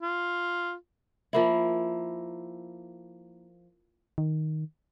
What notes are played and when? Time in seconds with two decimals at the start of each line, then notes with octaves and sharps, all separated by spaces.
0.02 F4
1.33 F3 A#3 E4
4.18 D#3